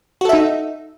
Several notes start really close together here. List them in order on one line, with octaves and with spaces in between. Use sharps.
F#4 A4 E5 D#4